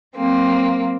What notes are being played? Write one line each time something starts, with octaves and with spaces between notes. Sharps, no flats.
F#3 A#3 C4